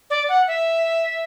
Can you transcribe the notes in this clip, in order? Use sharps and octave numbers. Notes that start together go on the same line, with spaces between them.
D5
F#5
E5